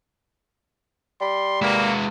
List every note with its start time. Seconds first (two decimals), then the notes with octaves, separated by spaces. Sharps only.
1.21 G3 C6
1.62 G#3 A#3 E4 F#4 B4